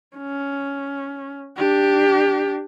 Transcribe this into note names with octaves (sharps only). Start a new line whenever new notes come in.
C#4
D4 G4